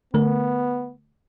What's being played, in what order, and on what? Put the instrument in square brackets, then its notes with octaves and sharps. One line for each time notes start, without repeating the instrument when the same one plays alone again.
[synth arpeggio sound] D3 A3 A#4 [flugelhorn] B3